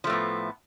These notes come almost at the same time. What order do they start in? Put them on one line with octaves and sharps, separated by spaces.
F3 A3 A2 B3